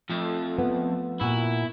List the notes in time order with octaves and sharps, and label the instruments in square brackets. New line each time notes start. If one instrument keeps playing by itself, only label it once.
[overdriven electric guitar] F2 [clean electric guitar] F3 A3
[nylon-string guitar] B3
[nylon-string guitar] A#2 [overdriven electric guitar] E4 [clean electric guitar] F#4